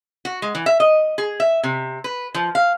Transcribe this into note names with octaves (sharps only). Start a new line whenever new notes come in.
F#4
G#3
E3
E5
D#5
G#4
E5
C3
B4
F3
F5